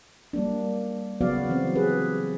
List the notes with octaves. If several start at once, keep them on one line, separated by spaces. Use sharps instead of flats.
G3 A#3 D4
C#3 F#3 B3 F#4 D5 F5
E3 F#3 C4
G4 G#4 B4